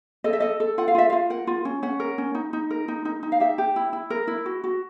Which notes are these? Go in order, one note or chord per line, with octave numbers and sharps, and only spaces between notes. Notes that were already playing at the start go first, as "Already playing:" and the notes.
A4 D#5
E5
A4 D#5
A4
F4 F#5
F5
F4 E5
F5
F4
A#4 F#5
F4
C#4
C#4 F#5
A#4
C#4
D#4
D#4
A#4
D#4
D#4
D#4
F5
G4 E5
G4
E4
E4
A#4
E4
F#4
F#4